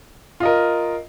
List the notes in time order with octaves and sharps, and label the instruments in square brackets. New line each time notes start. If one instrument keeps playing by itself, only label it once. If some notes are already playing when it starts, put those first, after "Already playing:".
[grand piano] F4
D#5
A#4